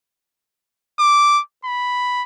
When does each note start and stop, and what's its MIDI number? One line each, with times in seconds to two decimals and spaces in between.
0.99 1.41 86
1.65 2.23 83